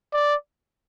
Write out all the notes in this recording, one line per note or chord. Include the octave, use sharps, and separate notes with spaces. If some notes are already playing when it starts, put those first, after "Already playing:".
D5